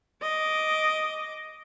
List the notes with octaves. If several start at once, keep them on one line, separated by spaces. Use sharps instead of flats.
D#5 D6